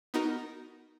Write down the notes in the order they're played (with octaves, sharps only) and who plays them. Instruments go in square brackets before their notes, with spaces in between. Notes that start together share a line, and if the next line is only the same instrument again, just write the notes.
[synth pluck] B3 D#4 F#4 A#4